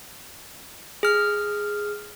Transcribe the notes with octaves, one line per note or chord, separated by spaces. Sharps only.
G#4 F6